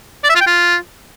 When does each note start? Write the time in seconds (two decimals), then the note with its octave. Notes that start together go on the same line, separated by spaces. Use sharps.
0.24 D5
0.30 E5
0.35 F4
0.41 G5
0.47 F4